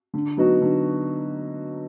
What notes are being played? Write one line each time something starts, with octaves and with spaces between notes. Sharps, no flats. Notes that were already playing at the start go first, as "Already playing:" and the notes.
D3
F#3 B3 D#4 F#4
D3